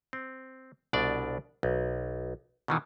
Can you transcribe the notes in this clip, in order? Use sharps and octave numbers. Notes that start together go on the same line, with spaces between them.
C4
C2 B2 D4 D5
B1
B2 D#3 E3